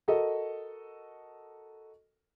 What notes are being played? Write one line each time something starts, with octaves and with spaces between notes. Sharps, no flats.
F#4 A4 A#4 D#5